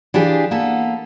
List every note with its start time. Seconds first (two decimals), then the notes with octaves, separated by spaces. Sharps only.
0.14 E3 D4 F4 G4 G#4
0.51 A#3 B3 A4